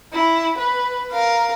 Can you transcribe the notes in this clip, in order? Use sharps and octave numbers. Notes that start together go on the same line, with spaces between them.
E4
B4
A#4 F5